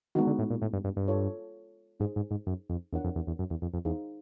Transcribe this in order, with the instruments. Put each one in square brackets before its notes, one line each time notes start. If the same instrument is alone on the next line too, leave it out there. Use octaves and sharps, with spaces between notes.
[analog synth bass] D#3 [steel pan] G#3 B3 D#4 F#4
[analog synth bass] D3
A2
A#2
A2
G2
G2
G2
[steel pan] F4 A4 C#5
[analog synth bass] G#2 [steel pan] D#4 G#4 C5
[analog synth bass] G#2
G#2
F#2
F2
[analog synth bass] E2 [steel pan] D4 F4 A#4 C#5 F#5
[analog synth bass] F2
E2
E2
F#2
E2
F2
F2
[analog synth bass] E2 [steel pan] D#4 G#4 C5 F5